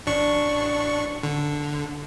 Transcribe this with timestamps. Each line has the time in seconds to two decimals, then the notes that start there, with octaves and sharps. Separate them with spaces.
0.06 A1 D4 C#6
1.23 D3